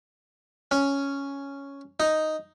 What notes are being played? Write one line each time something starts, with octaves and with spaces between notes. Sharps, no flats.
C#4
D#4